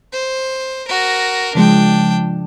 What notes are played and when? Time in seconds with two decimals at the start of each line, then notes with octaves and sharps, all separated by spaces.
0.13 C5
0.88 F#4 A#4
1.55 C#3 F3 G#3 D4 G5